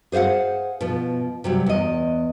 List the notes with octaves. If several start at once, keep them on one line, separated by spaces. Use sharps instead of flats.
G#4 C5 C#5 F5 F#5
B2 F3
C3 F#3 G3
E2 D#5